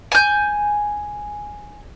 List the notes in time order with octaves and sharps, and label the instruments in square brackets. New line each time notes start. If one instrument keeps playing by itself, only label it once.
[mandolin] G#5 G6